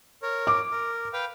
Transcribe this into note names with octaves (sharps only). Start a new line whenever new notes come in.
A#4 C#5
D6
A#4
B4 F5 G5